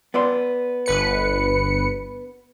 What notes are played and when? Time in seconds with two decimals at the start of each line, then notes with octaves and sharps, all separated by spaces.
0.14 B3 D5 C6
0.86 G1 B4 C#7